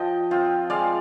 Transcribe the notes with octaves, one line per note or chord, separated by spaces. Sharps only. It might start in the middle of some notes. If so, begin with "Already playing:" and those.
Already playing: F3 D#5 G5
C4 F4
G#3 D5 F5